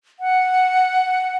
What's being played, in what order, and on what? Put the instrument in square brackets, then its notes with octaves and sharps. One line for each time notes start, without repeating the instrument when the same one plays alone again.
[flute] F#5